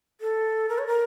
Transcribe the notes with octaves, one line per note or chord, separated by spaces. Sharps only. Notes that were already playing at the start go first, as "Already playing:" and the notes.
A4
A#4
C#5
A#4